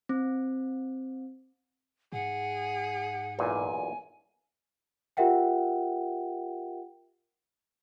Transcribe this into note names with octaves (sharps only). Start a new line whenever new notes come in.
C4
G#2 G#4 F#5
B1 E2 A#2 G#5
F4 G4 A#4 E5 F#5 G5